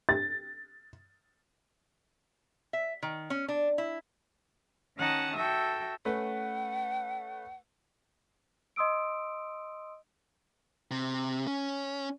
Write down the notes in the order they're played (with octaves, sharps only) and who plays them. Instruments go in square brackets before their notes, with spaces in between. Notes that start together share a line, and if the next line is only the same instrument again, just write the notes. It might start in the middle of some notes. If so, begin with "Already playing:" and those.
[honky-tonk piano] A6
[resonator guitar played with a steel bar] E5
D#3
C#4
D4
E4
[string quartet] D#3 C#4 D#4 F#5 A5 D#6
F#4 A4 E5 G5
[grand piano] A3 C#4 B4 [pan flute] F#5
[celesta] D#5 C6 D#6 E6 D7
[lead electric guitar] C3
C#4